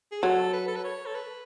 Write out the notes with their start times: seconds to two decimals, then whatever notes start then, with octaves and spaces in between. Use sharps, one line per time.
0.12 G#4
0.22 F#3 A4
0.53 B4
0.68 A4
0.76 B4
0.84 C#5
1.06 A4
1.15 B4